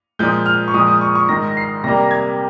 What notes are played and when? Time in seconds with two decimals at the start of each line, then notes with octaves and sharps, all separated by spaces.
0.19 A#2 F3 G#3 G6
0.46 F6
0.68 C#6
0.74 A#2 F3 G#3 D#6
0.87 D#6
1.01 C#6
1.15 C#6
1.29 G#2 D#3 G#3 A#6
1.57 C7
1.84 C3 G3 A#3 A#6
2.11 G#6